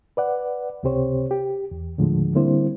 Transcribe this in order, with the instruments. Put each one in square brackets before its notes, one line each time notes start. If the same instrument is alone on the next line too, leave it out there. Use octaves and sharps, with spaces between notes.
[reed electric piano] B4 D5 F#5
C#2 C3 C4 G4 C5 C#5
G4
E2
D#2 A2 D3 F3 G#3
D3 G3 A#3 C4 E4 C5